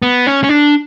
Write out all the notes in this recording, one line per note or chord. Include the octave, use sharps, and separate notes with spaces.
B3
C#4
C#4
D4